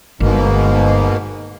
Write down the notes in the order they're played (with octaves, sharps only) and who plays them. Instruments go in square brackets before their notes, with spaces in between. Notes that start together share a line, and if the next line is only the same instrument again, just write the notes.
[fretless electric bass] G1 [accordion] G#2 B2 A#3